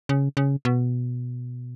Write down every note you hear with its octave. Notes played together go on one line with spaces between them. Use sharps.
C#3
C#3
B2